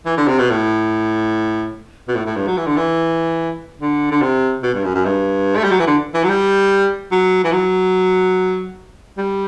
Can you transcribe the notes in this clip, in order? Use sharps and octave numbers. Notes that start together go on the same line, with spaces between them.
E3
D3
C3
B2
A2
B2
A2
A2
G2
F#3
E3
D3
E3
D3
D3
C3
B2
G2
F#2
F#2
G2
A3
G3
F#3
E3
D3
E3
F#3
G3
F#3
E3
F#3
G3